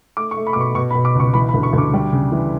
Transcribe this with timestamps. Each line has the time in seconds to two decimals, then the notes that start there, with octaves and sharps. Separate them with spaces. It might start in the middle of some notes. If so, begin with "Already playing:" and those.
0.17 A3 D6
0.31 C#6
0.37 A3
0.47 B5
0.53 D6
0.56 B2 C#6
0.75 B2 C#6
0.91 B5
0.95 B2
1.05 D6
1.15 C#2 C#6
1.34 E3 B5
1.49 B5
1.54 D2
1.63 C#6
1.73 D2
1.78 D6
1.94 G3
2.13 C#3
2.32 E3